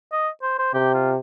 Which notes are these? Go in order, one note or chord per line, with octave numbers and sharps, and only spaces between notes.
D#5
C5
C5
C3 G4
F4